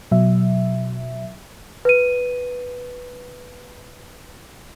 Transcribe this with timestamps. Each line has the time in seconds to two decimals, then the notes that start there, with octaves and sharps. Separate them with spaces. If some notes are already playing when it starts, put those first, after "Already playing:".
0.12 B2 F#3 E5
1.85 B4 D#7